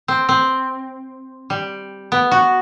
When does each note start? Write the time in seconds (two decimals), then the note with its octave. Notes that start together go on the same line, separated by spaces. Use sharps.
0.08 C4
0.29 C4
1.50 G3
2.12 B3
2.31 F#4